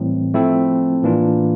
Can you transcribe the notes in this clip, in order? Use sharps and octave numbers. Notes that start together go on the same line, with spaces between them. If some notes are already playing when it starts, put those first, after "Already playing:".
Already playing: A2 E3 G3 C4
F3 A3 C4 E4 A4
A2 E3 A#3 D4 F4